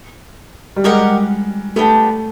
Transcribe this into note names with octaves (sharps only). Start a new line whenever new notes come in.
G3
G#3 G4 A#4 D#5 F#5
A3 B3 D4 G4